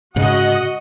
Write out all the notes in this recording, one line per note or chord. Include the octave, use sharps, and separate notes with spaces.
G#2 C#3 F#4 D#5 F#5